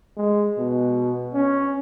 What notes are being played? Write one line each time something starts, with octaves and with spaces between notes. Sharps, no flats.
G#3
B2
C#4